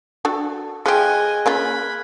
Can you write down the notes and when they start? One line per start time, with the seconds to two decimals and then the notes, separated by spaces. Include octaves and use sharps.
0.25 D4 F#4 A4
0.86 F3 G4 G#4 D#5 G#5 F6 F#6 G#6
1.46 A#3 C#4 F4 B5